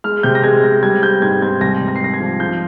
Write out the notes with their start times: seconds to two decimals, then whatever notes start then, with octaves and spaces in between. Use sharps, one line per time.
0.04 G#3 F6
0.23 C3 G6
0.35 A#6
0.43 G#3 G#6
0.64 G#3 A#6
0.83 G3 G#6
1.03 C4 G6
1.22 G#2 G#6
1.42 C4 G#6
1.61 C2 A#6
1.81 C2
1.88 A#6
1.96 C7
2.01 C2 A#6
2.14 G#6
2.20 F3
2.40 F3 G6